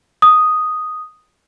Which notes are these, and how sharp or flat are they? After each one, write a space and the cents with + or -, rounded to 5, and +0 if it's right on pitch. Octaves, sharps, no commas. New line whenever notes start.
D#6 +0